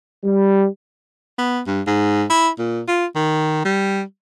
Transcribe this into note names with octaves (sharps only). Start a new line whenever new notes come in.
G3
B3
G2
G#2
E4
A#2
F4
D#3
G3